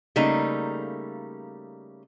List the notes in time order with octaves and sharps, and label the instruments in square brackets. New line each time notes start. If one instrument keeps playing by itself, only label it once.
[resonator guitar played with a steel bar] C#3 G3 A3 A#3 D#4